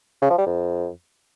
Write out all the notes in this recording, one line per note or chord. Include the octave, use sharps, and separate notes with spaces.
C#3
F3
G3
F2